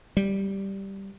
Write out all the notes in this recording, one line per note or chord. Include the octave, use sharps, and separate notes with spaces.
G3